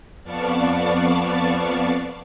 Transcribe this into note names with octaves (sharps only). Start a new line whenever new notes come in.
F2 B3 D5 F5 A5 C#6